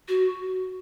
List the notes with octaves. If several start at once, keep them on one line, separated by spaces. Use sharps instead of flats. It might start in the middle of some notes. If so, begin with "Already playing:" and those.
F#4